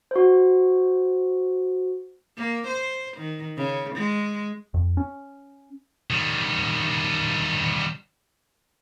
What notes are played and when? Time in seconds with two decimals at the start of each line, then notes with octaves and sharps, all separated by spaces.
0.11 F#4 C5
2.37 A#3
2.68 C5
3.18 D#3
3.57 C#3
3.96 G#3
4.74 F2
4.97 C#4
6.10 D#3 G3